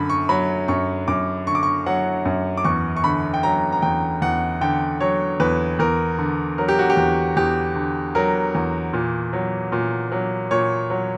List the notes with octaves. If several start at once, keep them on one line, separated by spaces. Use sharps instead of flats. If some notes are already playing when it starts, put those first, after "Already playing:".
Already playing: F#2 D3 B5
C#6
F#3 B5
F#2 C#6
F#2 D6
D3 C#6
D6
C#6
F#3 F#5
F#2
D6
E2 C#6
C#6
D3 B5
G5
F#3 A#5
A#5
E2 G5
E2 F#5
D3 G5
F#3 C#5
E2 B4
E2 A#4
D3
F#3 A#4
G4
F#4
G4
E2
E2 G4
D3
F#3 A#4
E2
A#2
F#3
A#2
F#3
A#2 C#5
F#3